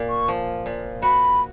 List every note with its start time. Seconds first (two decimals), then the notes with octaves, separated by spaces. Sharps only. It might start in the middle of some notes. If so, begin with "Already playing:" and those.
Already playing: A#2 A#3
0.09 C#6
0.28 F3
0.66 A#2
1.02 F#4 B5